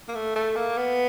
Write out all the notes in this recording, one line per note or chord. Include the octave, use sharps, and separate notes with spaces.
A#3
A3
A3
A#3
B3